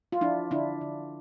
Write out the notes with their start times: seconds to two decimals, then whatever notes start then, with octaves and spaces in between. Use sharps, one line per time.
0.12 F4
0.21 F3 D4 E4
0.51 D3 D4 E4
0.81 D3